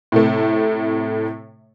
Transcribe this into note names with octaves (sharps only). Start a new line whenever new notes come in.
A2 C3 A3